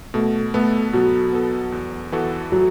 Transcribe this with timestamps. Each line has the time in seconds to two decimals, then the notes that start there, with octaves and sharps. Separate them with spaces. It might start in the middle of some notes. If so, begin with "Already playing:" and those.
0.14 B2 A3
0.54 A3 B3 A4
0.93 B2 F#3
1.33 B3 A4
1.72 E2
2.12 E3 B3 F#4 A4
2.52 F#3